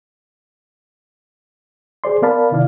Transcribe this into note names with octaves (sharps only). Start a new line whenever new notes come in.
G#4 C5 D5 C6
B3 A#4 D5 F5 A5 B5
C3 D#3 E4 D5 F5